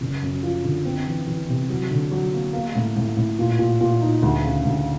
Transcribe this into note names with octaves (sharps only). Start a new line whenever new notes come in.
F#1
F#2
F3
D3
C4
E3
E3
C3
F#3
D3
F#3
A#3
A#3
A2
A2
A2
A#2
A#2
A#2
D#4
D2
C#3
D2